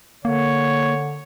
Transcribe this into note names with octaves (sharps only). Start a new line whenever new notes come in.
D3 A#3 C#5